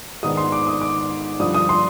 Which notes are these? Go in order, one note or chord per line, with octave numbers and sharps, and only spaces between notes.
G#2 D#3 B3 D4 D#6
C6
D6
D#6
D6
G2 D3 F3 D#6
D#6
C6